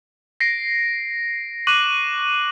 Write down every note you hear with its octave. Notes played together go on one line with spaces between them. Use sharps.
A#6 C7 D7
C#6 D6 F#6 D#7 F#7